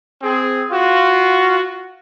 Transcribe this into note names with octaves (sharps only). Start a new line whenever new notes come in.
C4 G#4
F4 F#4